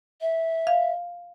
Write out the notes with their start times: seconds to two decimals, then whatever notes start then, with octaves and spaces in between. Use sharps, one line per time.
0.21 E5
0.67 F5